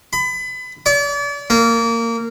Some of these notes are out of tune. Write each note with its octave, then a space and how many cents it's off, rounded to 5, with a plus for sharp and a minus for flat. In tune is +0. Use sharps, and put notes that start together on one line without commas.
B5 +30
D5 -40
A#3 -20